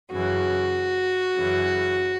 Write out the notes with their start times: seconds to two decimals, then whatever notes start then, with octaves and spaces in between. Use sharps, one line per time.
0.11 F#2 C#3 E3 F#4
1.35 F#2 C#3 E3